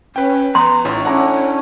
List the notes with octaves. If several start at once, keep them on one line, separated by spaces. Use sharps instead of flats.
C#4 B4 G5
B3 A#5 C6
A1 A2 C#4 D#4 F4 C#6
A3 C#4 D4 E4 F#5 A#5 D6